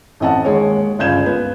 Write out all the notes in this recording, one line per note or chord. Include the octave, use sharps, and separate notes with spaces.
A1 F2 D#5 F#5 A5
D#2 G#3 C#5
G1 C#2 F4 G6 G#6 E7
B3